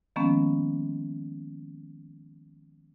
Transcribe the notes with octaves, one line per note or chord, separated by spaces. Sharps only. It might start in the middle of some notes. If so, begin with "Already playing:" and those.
D#3 F3 G#3 A#3 B3 C#4